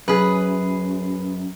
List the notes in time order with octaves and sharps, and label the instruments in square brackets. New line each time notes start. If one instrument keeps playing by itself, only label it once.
[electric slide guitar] F#2 [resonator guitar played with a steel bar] G#4 B4